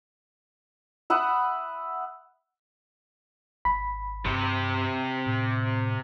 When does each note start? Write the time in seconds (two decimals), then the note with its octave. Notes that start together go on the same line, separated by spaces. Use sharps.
1.10 E5 F#5 B5 D#6
3.65 G#1 B5
4.26 G2 C3 G4
5.26 A2